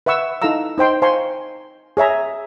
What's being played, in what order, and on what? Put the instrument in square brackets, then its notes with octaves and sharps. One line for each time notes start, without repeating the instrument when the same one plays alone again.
[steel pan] B4 E5 F#5 C#6 E6
D#4 E4 A4 F5 A#5 E6
D#4 C5 G5 C6
C5 F5 G#5 A#5 C6 C#6
G#4 C#5 E5 A#5